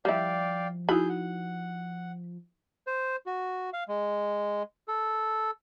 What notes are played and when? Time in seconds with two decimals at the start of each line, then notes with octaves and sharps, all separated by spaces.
0.05 F3 G3 E4 D5 F5 G5
0.89 D#4 E4 F#4 G#4 B5 G6
1.09 F#5
2.87 C5
3.26 F#4
3.73 F5
3.88 G#3
4.88 A4